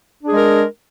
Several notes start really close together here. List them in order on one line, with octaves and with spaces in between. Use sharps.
D4 G#4 G#3 A#4